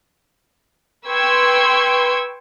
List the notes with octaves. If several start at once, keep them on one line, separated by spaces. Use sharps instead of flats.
B4 G5 C6 C#6 E6 G#6